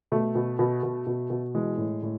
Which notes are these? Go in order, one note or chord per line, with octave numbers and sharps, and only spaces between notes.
B2 A3
B2
B2
B2
B2
B2
E3 G#3
A2
A2